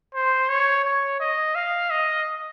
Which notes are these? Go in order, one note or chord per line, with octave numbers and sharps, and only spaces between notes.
C5
C#5
C#5
D#5
F5
D#5